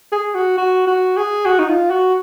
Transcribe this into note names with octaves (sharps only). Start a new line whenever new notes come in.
G#4
F#4
F#4
F#4
G#4
F#4
D#4
F4
F#4